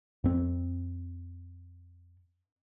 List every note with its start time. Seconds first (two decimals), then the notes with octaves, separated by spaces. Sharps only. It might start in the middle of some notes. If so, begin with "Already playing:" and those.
0.24 F2 C4